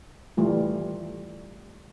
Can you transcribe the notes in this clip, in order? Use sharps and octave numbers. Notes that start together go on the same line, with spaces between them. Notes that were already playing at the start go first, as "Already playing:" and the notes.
E3 G3 A3 F4